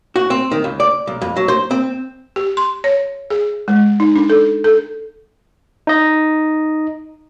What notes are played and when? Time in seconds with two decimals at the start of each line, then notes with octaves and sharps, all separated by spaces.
0.16 F#4
0.30 C4
0.52 D#3
0.64 C#2
0.80 D5
1.07 B1
1.21 F2
1.36 F#3
1.48 C5
1.71 C4
2.36 G4
2.57 C6
2.84 C#5
3.30 G#4
3.68 G#3
4.00 D#4
4.16 D4
4.30 A4
4.64 A4
5.87 D#4 D#5